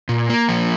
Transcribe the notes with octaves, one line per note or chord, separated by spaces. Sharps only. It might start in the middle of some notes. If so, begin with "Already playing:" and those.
A#2
A#3
F3